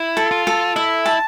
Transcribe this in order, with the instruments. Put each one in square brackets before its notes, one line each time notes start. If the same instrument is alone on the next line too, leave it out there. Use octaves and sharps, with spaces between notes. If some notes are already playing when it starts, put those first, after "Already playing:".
Already playing: [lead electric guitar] E4
[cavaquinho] A4
[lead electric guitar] F4
[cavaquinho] A4
[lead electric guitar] E4 [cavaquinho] E5
[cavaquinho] A5